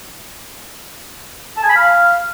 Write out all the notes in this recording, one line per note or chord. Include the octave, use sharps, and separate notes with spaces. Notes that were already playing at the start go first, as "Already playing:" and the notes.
A5
G#5
B5
F5